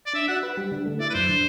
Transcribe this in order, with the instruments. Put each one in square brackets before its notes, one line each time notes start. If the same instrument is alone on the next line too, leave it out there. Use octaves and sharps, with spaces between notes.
[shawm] D5
[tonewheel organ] D4 [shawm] E5
[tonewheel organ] F#4 [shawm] F#5
[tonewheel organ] B4
G3
D3
A3
[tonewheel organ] E4 [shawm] D5
[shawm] B4
[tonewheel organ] F#2 [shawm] C5
[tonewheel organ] D3